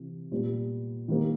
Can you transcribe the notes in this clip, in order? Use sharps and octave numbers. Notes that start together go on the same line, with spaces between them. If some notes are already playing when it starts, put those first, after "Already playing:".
Already playing: C3 E3
A#2 G3 B3
D#3 G3 A#3